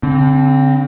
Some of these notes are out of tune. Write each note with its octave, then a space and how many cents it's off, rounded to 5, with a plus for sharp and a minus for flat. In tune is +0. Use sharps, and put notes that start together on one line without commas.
D3 -40 C4 +0